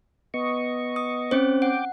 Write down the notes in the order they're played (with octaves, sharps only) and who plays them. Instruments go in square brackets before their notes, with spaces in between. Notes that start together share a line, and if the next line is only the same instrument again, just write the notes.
[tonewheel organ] B3 D#5 C#6
[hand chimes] D#6
C4 C#4 C5
[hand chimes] F#5 [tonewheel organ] G5 D6